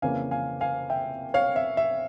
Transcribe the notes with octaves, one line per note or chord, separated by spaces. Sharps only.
F2 C#3 E3 A#3 C#4 F5 G#5
F5 G#5
F5 G#5
E5 G5
C#5 F5
E5
E5